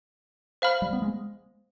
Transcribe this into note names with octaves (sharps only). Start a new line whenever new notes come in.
C5 F5 B5 F6
G3
B3
G#3